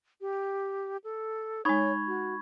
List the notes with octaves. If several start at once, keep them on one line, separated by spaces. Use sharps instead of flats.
G4
A4
G#3 D#4 C#5 B5 C#6 G#6
F#4